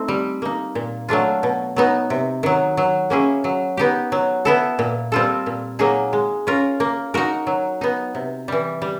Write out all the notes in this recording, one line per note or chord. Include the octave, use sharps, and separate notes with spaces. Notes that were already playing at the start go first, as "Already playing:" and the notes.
Already playing: A3 C4 D#4
G3
A#3 D#4
A#2
F#3 A3 D4 F4
B2
F#3 B3 D#4
C3
D#3 F#3
F#3
A#3 C#4 E4 G#4
F#3
B3 D#4 G4
F#3
B3 E4 A4
A#2
G3 C4 F4 A4
A#2
F#3 A#3 D#4 G#4
G#3
C#4 F4 A#4
A#3
D#4 F#4 A#4
F#3
B3 D#4
C3
E3 G3
G3